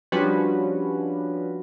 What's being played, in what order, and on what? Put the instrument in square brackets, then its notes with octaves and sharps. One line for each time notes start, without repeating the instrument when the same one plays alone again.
[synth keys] F3 G3 C#4 D4 F#4 B4